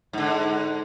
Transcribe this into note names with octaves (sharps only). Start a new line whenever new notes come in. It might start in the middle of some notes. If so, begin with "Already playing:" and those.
G#2 D3